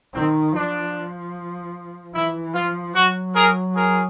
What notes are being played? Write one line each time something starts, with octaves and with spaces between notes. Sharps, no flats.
D#3 C4
F3 D4
E3 E4
F3 F4
F#3 F#4
G#4 A#4
G#4 A#4